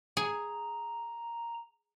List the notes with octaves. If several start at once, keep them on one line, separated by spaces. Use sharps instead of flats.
G#4 A#5